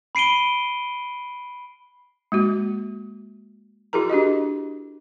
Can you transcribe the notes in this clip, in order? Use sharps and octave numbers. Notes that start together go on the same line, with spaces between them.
B5 C7 D7 D#7 G7
G#3 A#3 F#4
E4 F#4 G#4 A#4 A#5
D4 F#4 G4 D#5